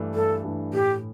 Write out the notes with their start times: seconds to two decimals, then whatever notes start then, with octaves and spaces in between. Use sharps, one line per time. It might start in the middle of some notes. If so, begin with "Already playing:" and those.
Already playing: G2 E3 A3 D4
0.14 G2 A4
0.44 E3 A3 D4
0.74 A2 G4